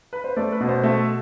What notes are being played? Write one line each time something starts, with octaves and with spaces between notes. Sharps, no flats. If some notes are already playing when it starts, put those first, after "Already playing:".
B4
C5
A3 D5
B4
B2
C5
A3 E5